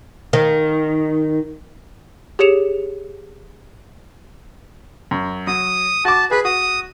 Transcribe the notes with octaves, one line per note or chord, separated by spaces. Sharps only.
D#3
G4 G#4 C#5 C#7 E7 F7
F#2
F#3 D#6
F#4 A5 D6
G#4 B4
F#4 D#6